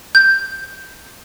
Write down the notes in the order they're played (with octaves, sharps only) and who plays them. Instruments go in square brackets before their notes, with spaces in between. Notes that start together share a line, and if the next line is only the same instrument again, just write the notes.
[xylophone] G6